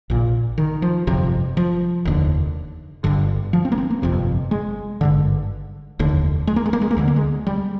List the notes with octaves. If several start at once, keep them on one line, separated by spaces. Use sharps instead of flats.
A#1 A#2
D#3
F3
G1 F2 C3
F3
F1 D#2 D3
G1 G2 D3
F3
C4
A#3
C4
A#3
G1 F2 C3
G#3
G#1 G2 D3
F1 D#2 D3
G#3
A#3
G#3
A#3
G#3
A#3
D2 D3 G#3
A#3
G#3
G3